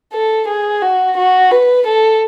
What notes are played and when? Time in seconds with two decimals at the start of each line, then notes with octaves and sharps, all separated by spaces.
0.13 A4
0.48 G#4
0.82 F#4
1.17 F#4
1.51 B4
1.86 A4